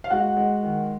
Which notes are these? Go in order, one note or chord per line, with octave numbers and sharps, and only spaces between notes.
F5
G#3 F#4 F#5
G#3
D#3